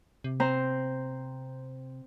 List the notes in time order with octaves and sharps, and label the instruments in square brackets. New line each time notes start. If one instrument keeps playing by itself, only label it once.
[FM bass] C3
[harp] C4 C5 A#5